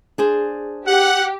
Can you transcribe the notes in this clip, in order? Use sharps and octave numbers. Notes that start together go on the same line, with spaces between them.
D4 G#4 C5
G4 F#5